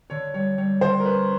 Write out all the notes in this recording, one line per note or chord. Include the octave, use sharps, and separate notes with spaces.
D3 C#5
G3 C#5
G3 C#5
D3 C5
A#4
C#4 B4